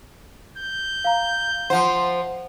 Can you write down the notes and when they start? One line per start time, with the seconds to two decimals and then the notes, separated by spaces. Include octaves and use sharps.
0.58 G6
1.04 F5 A#5
1.70 F3 C5 F#5